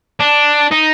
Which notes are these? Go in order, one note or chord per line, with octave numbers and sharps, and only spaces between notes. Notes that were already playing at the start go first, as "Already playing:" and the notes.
D4
D#4